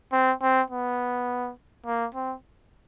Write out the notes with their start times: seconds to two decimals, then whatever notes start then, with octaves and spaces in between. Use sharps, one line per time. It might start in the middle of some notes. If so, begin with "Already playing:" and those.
0.12 C4
0.42 C4
0.70 B3
1.86 A#3
2.14 C4